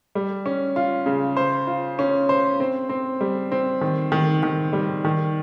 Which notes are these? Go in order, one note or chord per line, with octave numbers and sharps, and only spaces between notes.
G3
C#4
F4
C#3
C5
F4
C#4
C5
C4
C4
G3
C4
D#3
D#3
D#3
G3
D#3